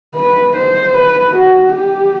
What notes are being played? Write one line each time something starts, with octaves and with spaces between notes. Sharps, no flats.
B4
C5
B4
F#4
G4